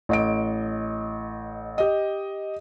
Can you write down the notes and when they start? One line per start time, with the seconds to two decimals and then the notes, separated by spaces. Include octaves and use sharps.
0.09 A1 D#5 D7
1.78 G4 D#5